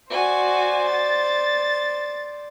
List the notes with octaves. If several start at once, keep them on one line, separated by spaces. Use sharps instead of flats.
F#4 C5 D5 G#5
A6